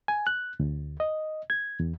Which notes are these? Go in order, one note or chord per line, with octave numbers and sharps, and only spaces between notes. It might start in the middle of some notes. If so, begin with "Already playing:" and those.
G#5
F#6
D2
D#5
G#6
E2